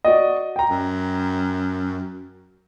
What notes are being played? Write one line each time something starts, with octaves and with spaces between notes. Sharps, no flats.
F#4 D5 D#5
G5 A#5
F#2